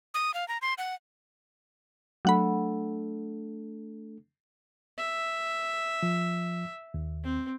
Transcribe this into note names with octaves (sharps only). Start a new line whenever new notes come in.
D#6
F5
A#5
C6
F#5
F#3 A3 D4 A4 F#5 B5
E5
F3
D#2
C4